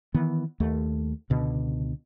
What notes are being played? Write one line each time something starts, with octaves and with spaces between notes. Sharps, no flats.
D#3 E3 B3
D#2 A3
C#2 B2 D3